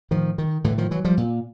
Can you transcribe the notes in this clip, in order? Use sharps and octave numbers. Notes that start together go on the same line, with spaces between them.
A2 D#3 F3
D#3
A2 D3 E3
D#3 F3
E3 F#3
F3 G3
A#2